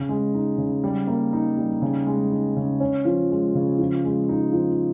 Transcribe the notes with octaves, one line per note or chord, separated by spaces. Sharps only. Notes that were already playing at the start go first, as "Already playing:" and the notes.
Already playing: C#3
G#3
D#4
C#3
G3
A#3
D#4
G3
C#3
G#3
D#4
C#3
C#4
F3
G#3
C#3
F3
G#3
D#4
F3